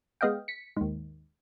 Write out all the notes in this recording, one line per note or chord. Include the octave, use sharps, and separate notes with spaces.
G#3 B3 D#5 F5 G5
B6 C#7
D#2 G#2